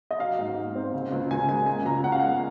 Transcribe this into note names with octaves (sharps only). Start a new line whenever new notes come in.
D#5
F#3 F5
G#2
D#4
C4
C#3
C#2
C#2 G#5
G#3 G#5
C#3 G#5
C#2 A#5
C#4 F#5
F5
G#3 F#5